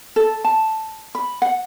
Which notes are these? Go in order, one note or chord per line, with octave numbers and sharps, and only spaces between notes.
A4
A5
B5
F#5